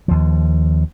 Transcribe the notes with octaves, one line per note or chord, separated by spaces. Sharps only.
D#2 F3